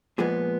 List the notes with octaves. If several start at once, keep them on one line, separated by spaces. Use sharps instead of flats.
A#2 F3 G#3 B3 G#4